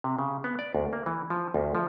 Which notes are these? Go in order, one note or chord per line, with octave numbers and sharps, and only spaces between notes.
C3
C#3
B3
D5
D2
A#3
E3
F3
D2
F3